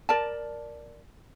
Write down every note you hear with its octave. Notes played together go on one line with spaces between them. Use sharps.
A#4 D5 A5